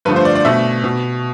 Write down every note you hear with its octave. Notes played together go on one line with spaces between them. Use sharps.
G2 D3 F3 A3 B4
C5
D5
D5
B2 A3 E5
B2